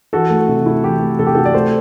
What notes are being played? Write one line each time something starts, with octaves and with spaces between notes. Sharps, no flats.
E3 F#4 A4
A3
C3
E4
E3 G4
A3
C3 A4
G4
E4 F#4 A4
D5
A3 A4 C5